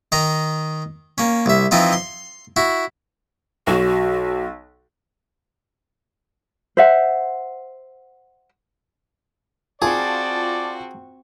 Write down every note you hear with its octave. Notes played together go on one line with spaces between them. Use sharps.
D#3 D#4 A#5
A#3 C#4
C2 E5
E3 F3 C4 D#4 F4
C6
E4 F#4
B1 F#4
C5 E5 F#5
C4 F4 F#4 G#4 D5 A5